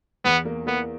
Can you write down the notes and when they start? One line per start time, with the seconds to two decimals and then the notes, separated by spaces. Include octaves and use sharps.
0.25 E2 B3
0.45 A#3
0.66 A#3 B3